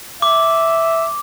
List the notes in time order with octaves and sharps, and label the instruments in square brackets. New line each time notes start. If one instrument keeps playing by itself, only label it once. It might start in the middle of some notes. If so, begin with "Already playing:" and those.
[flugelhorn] E5 [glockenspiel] D6